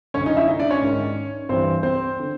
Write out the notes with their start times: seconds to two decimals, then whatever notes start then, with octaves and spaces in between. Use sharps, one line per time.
0.14 F#2 D3 C#4 C#5
0.26 D#4 D#5
0.37 E4 E5
0.48 D#4 D#5
0.60 D4 D5
0.71 C#4 C#5
0.81 G#2 D#3
1.49 G2 E3 C4 C5
1.83 C4 C5
2.20 D3